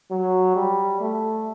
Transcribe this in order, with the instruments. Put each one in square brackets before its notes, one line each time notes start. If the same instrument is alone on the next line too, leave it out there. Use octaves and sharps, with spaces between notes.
[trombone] F#3
G3
A3